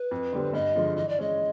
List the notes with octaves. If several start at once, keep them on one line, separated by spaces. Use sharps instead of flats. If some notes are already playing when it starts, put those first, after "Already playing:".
Already playing: B4
F2
D3 G3 C4
G2 D#5
D3 F3 G#3
E3 D#5
D5
G#3 C#4 D#5